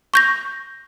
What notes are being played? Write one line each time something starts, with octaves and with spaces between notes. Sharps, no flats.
C#6 G6 A#6